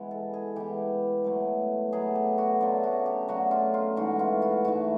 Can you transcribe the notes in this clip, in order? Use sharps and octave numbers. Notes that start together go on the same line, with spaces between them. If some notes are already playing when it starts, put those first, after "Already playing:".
Already playing: E3 G#3 B3
A4
G#4
E3 G#3 B3 G4
B2 F#3 A3
B2 F#3 A3 G#4
G4
F#4
C#3 F#3 A3 D4 F4
F#4
G4
C#3 F#3 A3 D4 F#4
F4
F4
G#2 E3 A3 F#4
F4
F#4
G#2 E3 A3 F#4